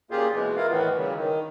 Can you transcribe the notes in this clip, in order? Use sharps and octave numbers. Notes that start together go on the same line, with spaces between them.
A#2 C#3 A#3 F4 G4 G#4
B2 E3 G#3
E4 F4 A#4 F5
A2 D#3 E3 B3
C#3 F#3 G3
D#3